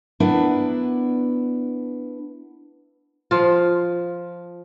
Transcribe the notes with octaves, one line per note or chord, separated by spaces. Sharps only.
B3 D4 E4 A#4 B4
F3 F4